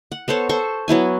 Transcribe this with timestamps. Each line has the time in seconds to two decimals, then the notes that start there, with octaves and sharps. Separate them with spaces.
0.12 F#5
0.28 B3 A4 C5 C#5
0.49 A4 C5 C#6
0.88 F#3 B3 E4 G#5